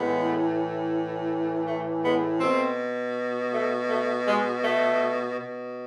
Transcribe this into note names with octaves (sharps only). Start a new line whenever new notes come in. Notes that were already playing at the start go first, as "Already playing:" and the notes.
Already playing: A2 E3 G#3 B3
A3
G#3 B3
B2 A3 C4
A3
A3
G#3
A3
B2